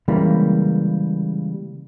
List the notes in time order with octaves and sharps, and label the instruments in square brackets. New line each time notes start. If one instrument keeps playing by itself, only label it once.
[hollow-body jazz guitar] C#3 E3 G3 G#3 A#3